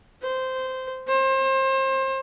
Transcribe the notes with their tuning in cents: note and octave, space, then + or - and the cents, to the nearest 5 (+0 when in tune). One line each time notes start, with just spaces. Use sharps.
C5 -10
C5 +30